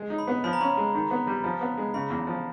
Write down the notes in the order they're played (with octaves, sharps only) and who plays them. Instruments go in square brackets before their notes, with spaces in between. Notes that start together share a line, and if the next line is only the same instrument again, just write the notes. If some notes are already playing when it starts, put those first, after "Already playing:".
Already playing: [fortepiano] G#3
D#4
[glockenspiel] B5
[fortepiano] B3
[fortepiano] F3 [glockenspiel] B5
[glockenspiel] A#5
[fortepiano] C#4 [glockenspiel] B5
[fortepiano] G#3
D#3
B3
G3
F3
B3
G#3
[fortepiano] C#3 [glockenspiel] B5
[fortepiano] E2
F3